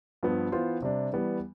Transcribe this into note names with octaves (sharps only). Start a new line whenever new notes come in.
G2 F3 B3
E3 B3 F4 C5
C3 G3 D4
E3 G3 B3